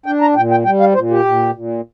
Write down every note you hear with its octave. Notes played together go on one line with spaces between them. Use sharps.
D4 G5
A#5
A#2 G5
G5
G3 G5
F5
A#2 C5
G4
A#2
A#2